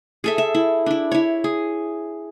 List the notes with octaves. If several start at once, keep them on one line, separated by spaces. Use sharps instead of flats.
G#4 A4 E5
E5
E4
D4 E4
E4 C#5
G#4